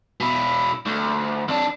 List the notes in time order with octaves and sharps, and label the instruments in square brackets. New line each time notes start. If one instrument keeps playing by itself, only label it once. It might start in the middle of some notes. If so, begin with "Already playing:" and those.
[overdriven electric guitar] B2 E4
D2
F2 D4